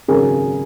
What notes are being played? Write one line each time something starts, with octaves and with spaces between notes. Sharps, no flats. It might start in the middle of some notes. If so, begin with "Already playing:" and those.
G#1 F#2 C#3 G#4 A#4